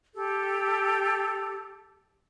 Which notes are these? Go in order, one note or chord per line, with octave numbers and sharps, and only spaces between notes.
G4 A4